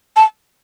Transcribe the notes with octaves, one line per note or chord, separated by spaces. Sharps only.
A5